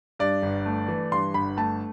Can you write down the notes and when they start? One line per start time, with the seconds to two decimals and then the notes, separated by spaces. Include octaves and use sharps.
0.19 G2 D5
0.43 G1
0.66 A3
0.88 E3
1.12 G2 C6
1.34 G1 B5
1.57 A3 A5